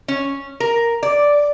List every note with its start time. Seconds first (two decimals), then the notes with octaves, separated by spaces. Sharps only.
0.08 C#4
0.60 A#4
1.03 D5